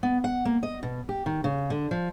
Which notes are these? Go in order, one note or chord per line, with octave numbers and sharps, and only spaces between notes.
B3
F#5
A#3
D#5
B2
G4
D#3
C#3
D3
F3